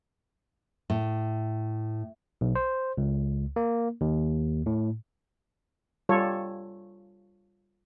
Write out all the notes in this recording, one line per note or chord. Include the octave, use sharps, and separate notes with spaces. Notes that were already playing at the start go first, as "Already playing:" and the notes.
A2
B1
C5
C#2
A#3
D#2
A2
G3 F4 A4 C#5